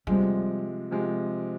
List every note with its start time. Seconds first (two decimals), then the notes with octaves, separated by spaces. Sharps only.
0.07 C3 F3 G3 G#3
0.91 C3 F3 G#3